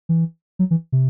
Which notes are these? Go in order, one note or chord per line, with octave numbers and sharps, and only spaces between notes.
E3
F#3
E3
C3